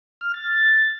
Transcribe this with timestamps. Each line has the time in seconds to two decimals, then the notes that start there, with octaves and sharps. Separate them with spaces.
0.21 F6
0.34 A6